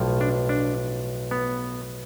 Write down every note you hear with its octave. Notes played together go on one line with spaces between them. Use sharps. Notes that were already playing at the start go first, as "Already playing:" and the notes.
Already playing: B1 A2 F3
D4
D4
B3